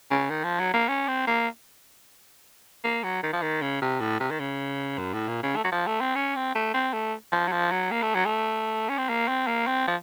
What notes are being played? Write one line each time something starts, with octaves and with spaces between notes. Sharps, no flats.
C#3
D#3
F3
F#3
A#3
C#4
C4
A#3
A#3
F#3
D#3
F3
D#3
C#3
C3
A2
C3
D#3
C#3
F#2
A2
A#2
C#3
A3
F#3
F3
A3
C4
C#4
C4
A3
C4
A3
F3
F#3
F3
F#3
A#3
A3
F#3
A3
C#4
C4
A#3
C4
A#3
C4
F3